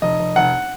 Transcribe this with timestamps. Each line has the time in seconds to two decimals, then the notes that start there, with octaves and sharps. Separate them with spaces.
0.02 F1 D#5
0.19 F1
0.36 F1 F#5